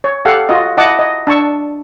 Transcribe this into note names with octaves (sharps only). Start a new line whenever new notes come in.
C#5
G4 A4 F5 F#5
F4 F#4 D#5
E4 D#5 F#5 A5 D6
D#5
D4 A5 C#6 E6